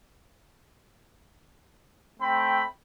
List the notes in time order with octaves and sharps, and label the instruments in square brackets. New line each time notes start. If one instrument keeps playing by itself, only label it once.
[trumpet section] A3 C4 G5 B5